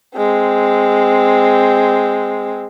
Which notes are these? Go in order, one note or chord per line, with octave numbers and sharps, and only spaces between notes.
G#3 C4